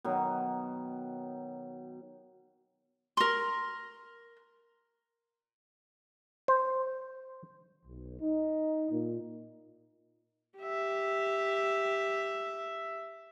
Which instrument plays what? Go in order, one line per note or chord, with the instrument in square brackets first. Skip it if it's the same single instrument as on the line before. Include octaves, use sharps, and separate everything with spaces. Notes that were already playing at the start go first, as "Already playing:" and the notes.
[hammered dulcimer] B2 D#3 F#3
[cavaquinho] A#4 C6
[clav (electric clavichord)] C5
[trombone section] B1
D#4
A#2
[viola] G4 E5